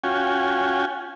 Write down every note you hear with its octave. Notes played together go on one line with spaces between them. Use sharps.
C#4 F4 F#4 G5 G#5